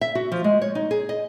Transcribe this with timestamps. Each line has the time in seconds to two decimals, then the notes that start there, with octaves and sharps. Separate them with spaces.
0.01 E5
0.15 F#4
0.32 F3
0.44 G#3
0.62 C#5
0.75 D#4
0.91 G#4
1.09 D#5